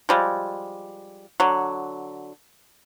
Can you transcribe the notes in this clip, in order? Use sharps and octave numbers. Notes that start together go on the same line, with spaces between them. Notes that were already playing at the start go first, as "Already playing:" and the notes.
F3 G3 G#3
D3 F#3